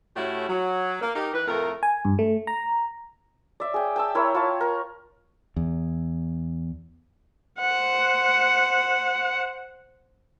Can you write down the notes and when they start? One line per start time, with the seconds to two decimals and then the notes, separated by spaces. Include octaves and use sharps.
0.16 A2 A3 C#4 E4 F#4 G4
0.49 F#3
1.02 A#3
1.15 D#4 G4 A#4
1.34 E3 B4
1.48 F2 A2 A3 A#4
1.83 G#5
2.05 G2
2.19 A3
2.47 A#5
3.60 D5 E5
3.74 G#4 G5
3.96 G5 A5 E6
4.15 E4 A#4 C#5
4.35 F4 C#5 A5
4.61 A#4
5.56 E2
7.60 C5 F#5